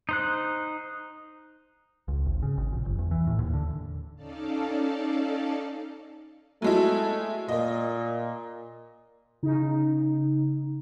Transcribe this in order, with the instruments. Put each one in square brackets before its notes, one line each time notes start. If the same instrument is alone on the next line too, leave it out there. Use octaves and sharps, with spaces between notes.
[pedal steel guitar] D#4 C5 F#6
[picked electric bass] C#2
G#1
C#3
G#1
A#1
G1
E2
E3
A2
D#2
D3
[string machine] C#4 D#4 A4 D5 F5 A5
[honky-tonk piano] F#3 G#3 E4 [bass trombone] A3
[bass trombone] A#2 [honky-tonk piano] A#3 D#5
[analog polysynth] C#3 D#4